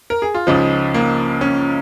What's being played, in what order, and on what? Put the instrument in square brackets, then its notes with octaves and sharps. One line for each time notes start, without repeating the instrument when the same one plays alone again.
[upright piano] A#4
G#4
F4
C#2 C#3 F3 D#4
A#3
C#4